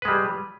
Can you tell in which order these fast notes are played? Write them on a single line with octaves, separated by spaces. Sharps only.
B4 G#3 G3